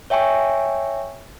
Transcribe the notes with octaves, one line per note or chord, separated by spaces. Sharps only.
C#5 E5 G5 G#5 C#6